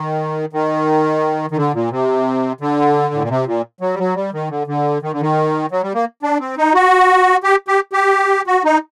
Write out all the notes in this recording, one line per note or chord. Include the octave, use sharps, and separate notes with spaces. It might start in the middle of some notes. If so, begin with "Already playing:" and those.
Already playing: D#3
D#3
D#3
D3
A#2
C3
D3
A2
A#2
C3
A#2
F#3
G3
F#3
G3
D#3
D3
D3
D#3
D3
D#3
F#3
G3
A#3
D4
C4
D#4
F#4
G4
G4
G4
F#4
D#4